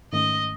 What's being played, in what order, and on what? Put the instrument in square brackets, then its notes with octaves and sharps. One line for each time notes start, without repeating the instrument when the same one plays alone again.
[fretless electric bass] G#2 D#3 A3 C#4 [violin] D#5